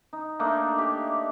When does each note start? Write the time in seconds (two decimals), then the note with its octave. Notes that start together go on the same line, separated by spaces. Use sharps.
0.13 D#4
0.39 A3 A#3 D4 D#4
0.78 G4